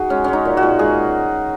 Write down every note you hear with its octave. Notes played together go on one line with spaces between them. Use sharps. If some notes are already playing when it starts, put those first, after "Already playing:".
Already playing: D#4 F#4 G#4
G#3 C#4
G#3 C#4
D#4
A#2
F#4
A#2
G#3 G#4